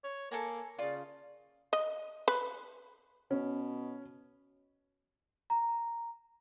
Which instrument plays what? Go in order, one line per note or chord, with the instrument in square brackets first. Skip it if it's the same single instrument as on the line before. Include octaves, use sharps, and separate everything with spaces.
[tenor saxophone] C#5
[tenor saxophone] A#3 [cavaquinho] A4 G#5 A#5
[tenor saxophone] C#3 [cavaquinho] F4 [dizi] D5
[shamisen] D#5
B4
[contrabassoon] B2 [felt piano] C#4
[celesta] A#5